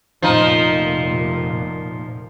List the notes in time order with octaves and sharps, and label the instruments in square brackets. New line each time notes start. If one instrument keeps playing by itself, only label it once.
[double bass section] F1 A#2 [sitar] F3 D#4